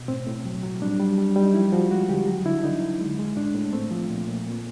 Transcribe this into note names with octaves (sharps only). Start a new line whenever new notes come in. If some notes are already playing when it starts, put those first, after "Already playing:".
Already playing: B2
A2 C4
A2
F#3
F#3
G3 D4
G3
G3
G3
D#4
F3 E4
F3 F#4
G#3 F#4
D3 G4
F#3 F#4
D3 E4
D3 D#4
D3
G#3
G#3
A2 D4
A2
A3 C4
F3
A#2
A#2
A#2